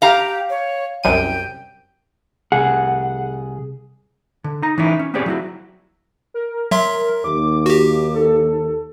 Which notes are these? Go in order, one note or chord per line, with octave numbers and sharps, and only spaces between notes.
G4 F5 A#5
C#5
C2 F#2 G5 D#7
C2 G#4 F#5
D3
D#4 A#5
E3 C#4 D#4 E4
C#4
B3 C4 G4 G#4 C#5 D5
F#3 E4 F#4
A#4
F#3 E5 C6
D#2 D6
F#4 G4
A4